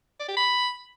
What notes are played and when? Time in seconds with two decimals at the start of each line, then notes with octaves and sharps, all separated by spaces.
0.20 D5
0.28 G4
0.37 B5